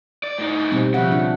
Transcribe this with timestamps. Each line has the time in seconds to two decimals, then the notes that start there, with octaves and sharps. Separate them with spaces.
0.24 D5
0.38 A2 D#4
0.72 B2 G3 C4
0.94 C#3 F3 E5 F#5
1.12 D4